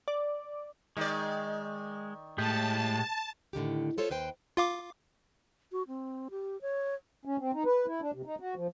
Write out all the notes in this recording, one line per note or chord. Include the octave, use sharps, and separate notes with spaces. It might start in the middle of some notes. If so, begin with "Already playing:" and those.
D5
D#3 G#3 D5
A2 G#3 G4 A5
A2 D3 D#3 G4
F4 A4 C5 C#5 E5
D#2 B4 C5 G5
F4 F5 D6
F#4
C4
G4
C#5
C#4
C4
D#4
B4
E4
D4
C3
D#4
F#4
F3